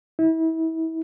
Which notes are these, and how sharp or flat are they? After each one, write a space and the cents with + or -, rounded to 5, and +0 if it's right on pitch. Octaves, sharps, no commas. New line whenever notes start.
E4 -35